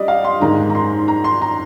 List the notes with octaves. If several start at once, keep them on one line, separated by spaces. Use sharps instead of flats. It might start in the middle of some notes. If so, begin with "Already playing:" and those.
Already playing: G3 D4 D5 D#5
F5
C6
G#2 D#3 G#3 A#5
A#5
C6
A#5
C6
A#5